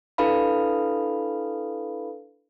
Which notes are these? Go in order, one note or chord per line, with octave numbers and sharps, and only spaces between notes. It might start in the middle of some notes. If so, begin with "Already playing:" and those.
D4 E4 A4 B4 F5 B5